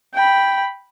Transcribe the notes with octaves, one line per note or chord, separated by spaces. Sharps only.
G5 B5